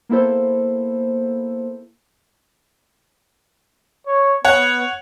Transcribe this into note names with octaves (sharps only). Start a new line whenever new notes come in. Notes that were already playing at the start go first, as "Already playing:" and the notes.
A#3 B3 E4 A4 C5
C#5
B3 C#5 F#5